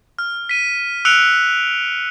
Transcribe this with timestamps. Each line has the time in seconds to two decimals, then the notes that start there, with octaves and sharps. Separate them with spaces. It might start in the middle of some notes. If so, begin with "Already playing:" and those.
0.19 F6
0.49 B6 D#7
1.05 E6 F#6 C#7 D7 F7 G7